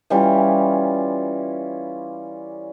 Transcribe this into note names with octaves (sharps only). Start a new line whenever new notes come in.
E3 G3 C#4 F4